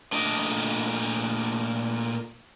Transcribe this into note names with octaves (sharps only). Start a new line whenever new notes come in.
A#2 A3 D4 A#4 D#5